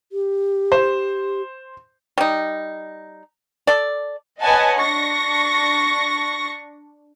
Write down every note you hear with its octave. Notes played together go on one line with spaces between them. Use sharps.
G4
C5
G3 D#4
A4 D5
B4 C#5 D#5 F#5 G#5 A5
D4 C#6 A#6